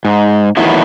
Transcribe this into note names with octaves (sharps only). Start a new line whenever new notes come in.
G#2
E2 A2 D#3 F#3 B3 E4